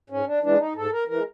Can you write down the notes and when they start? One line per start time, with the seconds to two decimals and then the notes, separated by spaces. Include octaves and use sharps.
0.10 G#2 C#4
0.27 D4
0.43 E3 G#3 D4
0.58 D#4
0.75 G#2 A4
0.92 A#4
1.08 E3 A#4
1.13 G#3